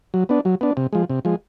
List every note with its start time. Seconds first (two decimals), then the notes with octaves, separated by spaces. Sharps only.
0.14 F#3
0.29 B3 D4
0.45 F#3
0.61 B3 D4
0.77 C3
0.93 F3 G#3
1.10 C3
1.25 F3 G#3